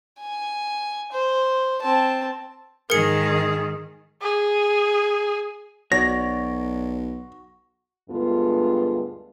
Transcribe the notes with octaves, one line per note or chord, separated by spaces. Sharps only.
G#5
C5
C4 A5
G#2 D#3 G#4 A#4 C#7
G#4
B1 F#4 C#5 D5 A#6
D2 G2 G#3 B3 F4 A4